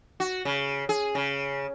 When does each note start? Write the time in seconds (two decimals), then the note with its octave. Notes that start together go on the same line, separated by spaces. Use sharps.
0.20 F#4
0.45 C#3
0.89 G#4
1.15 C#3